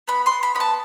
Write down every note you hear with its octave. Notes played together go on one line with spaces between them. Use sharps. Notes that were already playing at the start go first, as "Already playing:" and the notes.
B3 B5
C6
B3
B5
B3 B5
A5